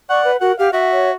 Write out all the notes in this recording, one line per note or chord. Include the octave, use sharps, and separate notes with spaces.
D5 F#5 C#6
B4
F#4 A#4 F#5
G4 F5 F#5
F#4 E5
C#5